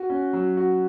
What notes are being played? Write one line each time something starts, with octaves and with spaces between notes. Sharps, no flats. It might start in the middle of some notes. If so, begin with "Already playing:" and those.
Already playing: F#4
C#4
F#3
F#4